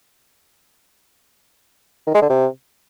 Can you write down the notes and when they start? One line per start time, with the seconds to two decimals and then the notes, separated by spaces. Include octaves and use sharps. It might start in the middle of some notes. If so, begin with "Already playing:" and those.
2.07 D#3
2.14 G#3
2.22 D3
2.29 C3